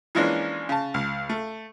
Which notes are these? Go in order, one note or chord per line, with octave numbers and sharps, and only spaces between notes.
E3 F3 G#3 A#3 C#4 D4
C#3 A5
C#2
A3